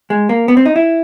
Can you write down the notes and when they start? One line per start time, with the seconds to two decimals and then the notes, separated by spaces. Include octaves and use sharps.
0.10 G#3
0.29 A#3
0.48 B3
0.57 C4
0.66 D#4
0.76 E4